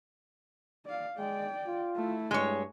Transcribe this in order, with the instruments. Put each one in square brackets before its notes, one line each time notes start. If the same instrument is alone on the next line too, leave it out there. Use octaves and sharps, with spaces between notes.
[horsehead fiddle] D5 F5
[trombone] G#3 [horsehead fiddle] D5 G5
[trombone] F4
[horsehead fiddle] A3 E4
[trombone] G2 [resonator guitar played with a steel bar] G#3 C#5